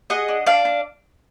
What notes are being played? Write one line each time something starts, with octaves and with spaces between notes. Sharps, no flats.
G#4 D#5 F#5
D4
D4 D5 F5
D4